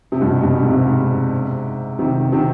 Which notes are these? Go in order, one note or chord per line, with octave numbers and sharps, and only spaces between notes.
C3
G2 B2
G2 B2
G#2 C3
C3 D#3
C3 D#3